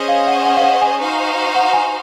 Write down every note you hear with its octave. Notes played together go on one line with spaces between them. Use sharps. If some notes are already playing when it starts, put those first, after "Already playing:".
Already playing: C#4 G#4 C5 D#5
F5
F#5
F#5
F5
F#5
G#5
D#4 F#4 C5 F5
F#5
G#5